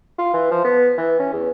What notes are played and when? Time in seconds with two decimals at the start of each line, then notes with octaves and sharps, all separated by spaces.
0.18 F4
0.34 E3
0.51 F3
0.65 B3
0.98 E3
1.19 C#4
1.33 E2